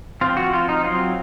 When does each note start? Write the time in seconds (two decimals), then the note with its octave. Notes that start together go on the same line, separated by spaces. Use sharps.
0.21 F3 C4 F4
0.37 F#4
0.53 F4
0.69 D#4
0.84 F#3 C4 F4